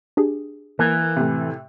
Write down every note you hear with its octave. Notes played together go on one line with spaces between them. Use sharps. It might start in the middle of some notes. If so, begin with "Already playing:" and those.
D4 G4 G#4
E3 A#3
A2 C3